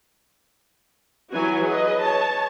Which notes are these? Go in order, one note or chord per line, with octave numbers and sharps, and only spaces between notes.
E3 F#3 G3 F#4 G#5
G#4 B4 D#5
C#5 A5